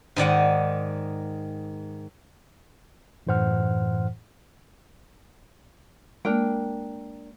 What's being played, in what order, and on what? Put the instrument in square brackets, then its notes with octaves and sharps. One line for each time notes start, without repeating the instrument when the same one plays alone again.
[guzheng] G#2 D#3 D5 F#5
[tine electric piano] F#2 A2 E3 C5 F#5 F6
[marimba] G#3 A#3 [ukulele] D4 A#4 G5